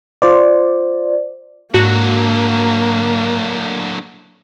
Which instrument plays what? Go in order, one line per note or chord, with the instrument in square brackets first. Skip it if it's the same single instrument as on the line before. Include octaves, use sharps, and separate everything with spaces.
[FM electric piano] F4 C5 D5
[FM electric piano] G#2 [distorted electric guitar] D3 F#3 [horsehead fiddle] A#3 [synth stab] F#4